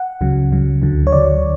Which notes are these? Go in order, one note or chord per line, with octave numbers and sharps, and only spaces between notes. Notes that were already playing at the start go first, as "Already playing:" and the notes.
Already playing: F#5
C#2 C#3 F#3
C#2 C#3 F#3
D2 D3 F#3
C#5
D2 D3 F#3 D5